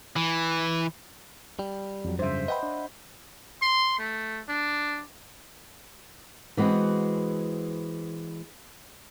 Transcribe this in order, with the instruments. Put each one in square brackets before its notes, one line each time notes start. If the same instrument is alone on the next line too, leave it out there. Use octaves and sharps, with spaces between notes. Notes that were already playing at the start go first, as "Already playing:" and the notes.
[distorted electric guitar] E3
[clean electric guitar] G3
[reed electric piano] F2 F#3
[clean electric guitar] G2 C#3 [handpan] C5 E5
[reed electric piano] B4 G5 [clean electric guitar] D#5 F#5 B5
[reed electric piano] D4
[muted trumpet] C6
A3
D4
[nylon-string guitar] E3 G#3 B3 C4 F#4